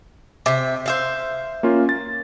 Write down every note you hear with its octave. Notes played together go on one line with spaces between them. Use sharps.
C3 E5
C5 E5 F5
A#3 C#4 F4
A6